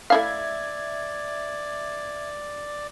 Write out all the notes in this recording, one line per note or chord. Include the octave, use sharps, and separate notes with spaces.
A3 E4 D5 E5 F5 G#6